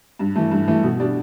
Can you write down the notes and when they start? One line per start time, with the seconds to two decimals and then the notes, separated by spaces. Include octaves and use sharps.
0.19 G2
0.36 E3 A3
0.51 G2
0.68 E3 A3
0.84 B2
1.00 G3 D4